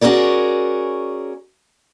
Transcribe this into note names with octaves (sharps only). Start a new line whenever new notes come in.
C#4 F#4 G#4 A#4 D5